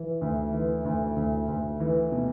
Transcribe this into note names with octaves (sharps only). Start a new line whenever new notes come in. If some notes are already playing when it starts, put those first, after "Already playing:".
Already playing: E3
D2
E3
D2
D2
D2
E3
B2